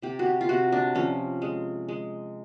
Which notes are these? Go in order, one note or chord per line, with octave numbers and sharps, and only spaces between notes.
C3 G4
F#4
G4
F4
C3 F#4
D4
F3 C#4
G#3
G#3